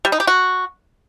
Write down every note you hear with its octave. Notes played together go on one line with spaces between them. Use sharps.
G3
D#4
G4
F#4